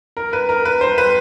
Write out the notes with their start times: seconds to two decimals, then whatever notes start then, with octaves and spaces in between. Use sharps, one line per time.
0.17 A#4
0.33 B4
0.49 A#4
0.65 B4
0.81 C5
0.98 B4